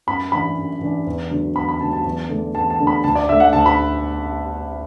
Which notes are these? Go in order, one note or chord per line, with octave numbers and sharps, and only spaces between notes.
F#2 B5
E3 D4 B5
F#2
E3 D4
E2
D3 F#3
E2 B5
B5
D3 F#3 A5
A5
E2
D3 A3 D4
E2 A5
A5
D3 A3 D4
B5
D2 A5
D5
D3 A3 E5
F#5
D2 A5
B5